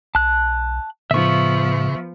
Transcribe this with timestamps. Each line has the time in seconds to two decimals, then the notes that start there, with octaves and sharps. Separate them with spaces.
0.15 B1 A5 F#6
1.11 A2 C#3 F3 B3 E5 C#6